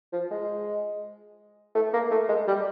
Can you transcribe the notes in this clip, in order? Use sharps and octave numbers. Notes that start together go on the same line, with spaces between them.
F3
G#3
A3
A#3
A3
G#3
G3